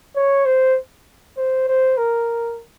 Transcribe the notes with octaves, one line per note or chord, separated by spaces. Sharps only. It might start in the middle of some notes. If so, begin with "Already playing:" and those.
C#5
C5
C5
C5
A#4